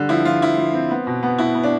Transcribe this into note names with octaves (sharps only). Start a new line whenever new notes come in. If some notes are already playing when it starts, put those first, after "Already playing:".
Already playing: D3 G3
F3 E4
F3 F4
F3 E4
F3
C4
B3
B2
B3
B2 E4
B3
D4